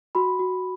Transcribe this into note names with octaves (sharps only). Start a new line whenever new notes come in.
F#4 B5
F#4